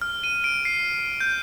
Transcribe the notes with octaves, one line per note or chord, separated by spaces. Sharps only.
F6
D#7
D7
C7
G6